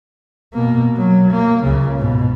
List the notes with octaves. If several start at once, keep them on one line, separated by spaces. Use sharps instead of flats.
B2 A#3
F#3
A#3
C#2 C#3
G#2 B2